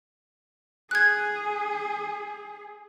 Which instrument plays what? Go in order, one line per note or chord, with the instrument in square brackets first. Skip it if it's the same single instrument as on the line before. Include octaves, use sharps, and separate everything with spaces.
[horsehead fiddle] G#4 [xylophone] F#6 G#6